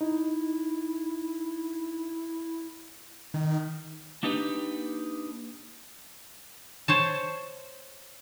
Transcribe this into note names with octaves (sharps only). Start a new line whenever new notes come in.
D#4 E4
D#3
A#3 D4 D#4 G4 B4
C5 C#5 A5